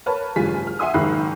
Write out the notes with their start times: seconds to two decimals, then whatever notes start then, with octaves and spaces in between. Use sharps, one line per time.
0.06 A#4 B4 C#5 A5 B5
0.36 F#1 G2 G#3 F4 G#5 B6
0.67 F6
0.79 E5 F#5 G#5 C6 D#6 E6
0.94 F#1 G#2 D#3 B5 F#6 C7